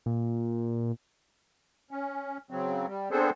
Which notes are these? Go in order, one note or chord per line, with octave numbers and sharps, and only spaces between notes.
A#2
C#4
C#3 F#3 C4
G3
B3 C4 D4 G#4 A4 C5